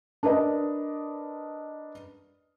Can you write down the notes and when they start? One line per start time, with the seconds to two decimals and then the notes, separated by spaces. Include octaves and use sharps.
0.23 D4 A#4 B4 D5 D#5